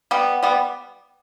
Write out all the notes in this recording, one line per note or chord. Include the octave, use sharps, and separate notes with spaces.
G3 B3
G3 B3